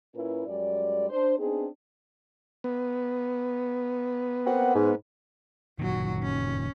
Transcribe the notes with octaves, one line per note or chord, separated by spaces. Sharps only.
A#2 C#4 E4 A#4 B4
F#2 G3 G#3 D5
D4 C5
B3 C4 D4 D#4 G#4
B3
A#3 C4 F#5
G#2
F#1 A#2 D#3 F#3 F#4
C#4